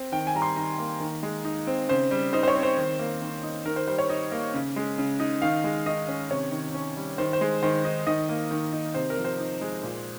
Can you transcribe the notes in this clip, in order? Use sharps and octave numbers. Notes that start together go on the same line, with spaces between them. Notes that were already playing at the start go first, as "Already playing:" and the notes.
Already playing: C4
D#3 G5
G#5
G3 A#5
C6
D#3 A#5
A#3
D#3
G#3
D#4
C4
C#3 C5
G3
D#4 C5
C5
C#5
C4
C5
D#3
A#3
D#3
D#4
D#3 A#4
C5
G3 C5
C#5
D#4
A#3
C#3
G#3
C#3
D#4
D#3 F5
G#3
D#3 D#5
C#4
C3 C#5
D#3
C#4
G3
D#3 C5
C5
G#3
D#3 C5
D#4
D#3 D#5
A#3
D#3
D#4
C3 C5
A#4
F3
C5
D#4
G#3
A#2